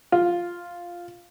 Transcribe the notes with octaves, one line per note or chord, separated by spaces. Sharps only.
F4